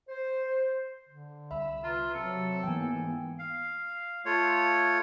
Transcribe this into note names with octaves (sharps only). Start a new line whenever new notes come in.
C5
D3
C2 E5 B5 E6
F4 B4 E5 A#5
C3 F#3 A4
G#2 E3 A#3 B3 G5 G#5
F5
A3 F4 C#5